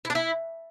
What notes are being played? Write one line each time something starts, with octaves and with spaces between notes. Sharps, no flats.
E4
D4
E4